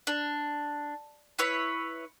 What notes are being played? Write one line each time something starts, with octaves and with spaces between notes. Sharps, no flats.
D4
E4 B4 C#5